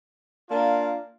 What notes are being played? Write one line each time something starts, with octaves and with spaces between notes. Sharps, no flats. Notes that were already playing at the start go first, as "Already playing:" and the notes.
A#3 D4 F4